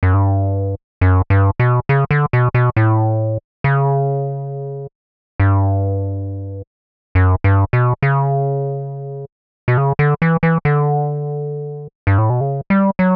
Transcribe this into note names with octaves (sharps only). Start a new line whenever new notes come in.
F#2
G2
F#2
G2
B2
C#3
D3
B2
B2
A2
C#3
G2
F#2
G2
B2
C#3
B2
C#3
D3
E3
E3
D3
G2
A2
B2
C#3
G3
F#3